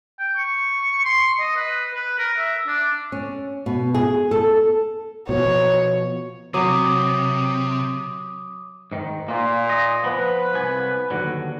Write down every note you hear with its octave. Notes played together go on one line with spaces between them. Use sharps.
G5
C#6
C6
D#5
B4
B4
A#4
E5
D4
C#4
B2
G#4
A4
B2 F3 C#5
C3 F#3 D6 D#6 D#7
G#2 D#3
A#2 A#3 F4
D#5
F3 B3 B4
C2 B3 G#5
D#2 D3 F#3